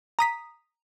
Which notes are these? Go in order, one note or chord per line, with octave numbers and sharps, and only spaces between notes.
A#5 D#6 B6